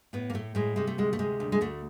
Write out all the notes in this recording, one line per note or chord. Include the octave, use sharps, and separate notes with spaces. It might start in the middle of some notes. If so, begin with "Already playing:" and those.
A2 B3
A#3
A2 A3
A2 G#3
C3 G#3
A3
D2 G#3
A3
C3 G#3
D2
G#3
D2 A3